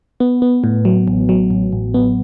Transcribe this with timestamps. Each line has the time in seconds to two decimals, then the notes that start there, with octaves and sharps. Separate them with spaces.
0.20 B3
0.42 B3
0.64 A2
0.85 F#3
1.08 A1
1.29 F#3
1.51 A1
1.72 A1
1.94 B3